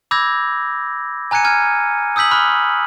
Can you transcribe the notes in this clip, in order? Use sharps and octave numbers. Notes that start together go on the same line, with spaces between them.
B5 D6 E6 G6 G#6 A#6
G#5 A#5 F#6 G#6 C#7 D#7
F6 G#6 D#7
D#6 E6 G6 B6 F#7
B5 C#6 F6 F#6